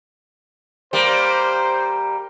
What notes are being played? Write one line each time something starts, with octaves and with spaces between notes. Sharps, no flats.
G3 A#3 C5